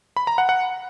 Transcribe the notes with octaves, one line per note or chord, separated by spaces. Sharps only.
B5
A#5
F#5
F#5